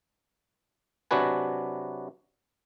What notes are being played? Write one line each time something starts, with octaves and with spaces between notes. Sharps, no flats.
C3 F#3 D4 F#4 B4 G#5